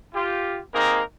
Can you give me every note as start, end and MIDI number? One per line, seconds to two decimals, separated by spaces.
0.15 0.60 65
0.15 0.60 67
0.74 1.01 58
0.74 1.01 60
0.74 1.01 63
0.74 1.01 68
0.74 1.01 70